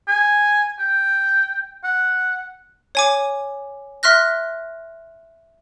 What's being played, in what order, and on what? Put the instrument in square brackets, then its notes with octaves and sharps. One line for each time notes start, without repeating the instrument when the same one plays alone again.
[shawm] G#5
G5
F#5
[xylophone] C#5 G#5 D6
E5 C6 F6 F#6 A#6